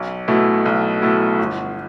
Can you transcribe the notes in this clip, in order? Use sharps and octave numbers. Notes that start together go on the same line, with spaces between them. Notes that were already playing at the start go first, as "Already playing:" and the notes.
Already playing: B1
B2 A3 E4
B1
B2 A3 E4
G1